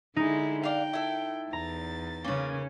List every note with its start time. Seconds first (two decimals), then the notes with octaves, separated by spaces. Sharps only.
0.16 D3 G#3 D#4 E4
0.63 D4 F5 G5
0.93 E4 A4
1.53 E2 A#5 A6
2.24 C#3 A#3 C#4 B4